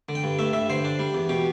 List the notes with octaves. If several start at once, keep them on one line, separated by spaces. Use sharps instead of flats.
D3
G5
G2
A3 E5
G2 E5
D3 C5
D4
G3
E2
B2 G4